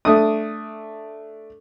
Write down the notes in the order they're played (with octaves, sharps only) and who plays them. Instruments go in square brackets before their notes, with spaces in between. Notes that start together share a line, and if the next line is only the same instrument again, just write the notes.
[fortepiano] A3 D4 D#6